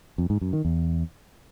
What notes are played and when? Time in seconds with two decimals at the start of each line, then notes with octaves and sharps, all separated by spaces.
0.18 F2
0.30 G#2
0.41 F#2
0.53 D#3
0.65 E2